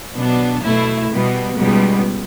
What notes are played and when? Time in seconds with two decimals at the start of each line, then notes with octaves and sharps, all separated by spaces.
0.17 B2 F#3 B3 D4
0.64 B2 A3 E4
1.11 B2 G3 B3
1.58 C#2 B2 G3 B3